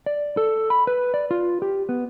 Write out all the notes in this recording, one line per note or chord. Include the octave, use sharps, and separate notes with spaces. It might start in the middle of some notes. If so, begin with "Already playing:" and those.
D5
A4
B5
B4
D5
F4
G4
B3